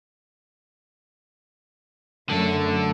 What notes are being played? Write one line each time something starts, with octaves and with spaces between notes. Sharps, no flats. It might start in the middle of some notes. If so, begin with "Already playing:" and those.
F#2 D3 A3 A4